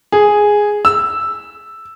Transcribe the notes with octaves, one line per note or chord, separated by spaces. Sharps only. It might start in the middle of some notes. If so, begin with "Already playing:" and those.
G#4
E6